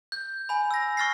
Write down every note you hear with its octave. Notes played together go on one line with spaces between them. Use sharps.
G6
G#5 B5
E6 A#6
C#6 E6 F6 A6 A#6 C7